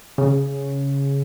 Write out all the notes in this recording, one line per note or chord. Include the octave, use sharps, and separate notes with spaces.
C#3